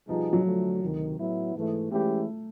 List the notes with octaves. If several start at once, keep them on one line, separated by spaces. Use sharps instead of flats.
B2 F3 G3 B3 D#4 G#4
F#3
D3 F3 A3
D2 C3 D#3
A2 F#3 B3 E4
G#2 E3 A3
E3 G#3 A3 C#4 E4 G4